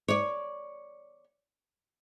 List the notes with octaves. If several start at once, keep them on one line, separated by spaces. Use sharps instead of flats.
C#5 D5